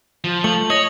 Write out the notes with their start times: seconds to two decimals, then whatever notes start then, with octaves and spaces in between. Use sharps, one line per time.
0.24 F3
0.44 A3 F#7
0.70 C#5 D#5 A#6 F#7